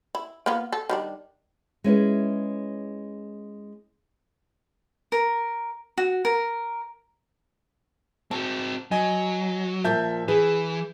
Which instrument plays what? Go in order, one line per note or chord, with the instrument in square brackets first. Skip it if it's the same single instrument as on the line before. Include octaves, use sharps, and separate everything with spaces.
[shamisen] E4
A#3 B3 F4
A4
D#3 G3 D4
[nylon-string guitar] G#3 C#4 E4 B4
[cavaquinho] A#4
F#4
A#4
[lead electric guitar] C4 F#4 [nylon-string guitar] A5
[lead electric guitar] F#3 [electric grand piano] D#5 G#5
[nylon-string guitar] A#2 F3 A#3 [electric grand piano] E5 A5 G6
[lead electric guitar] E3 [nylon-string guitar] G#4 [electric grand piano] B4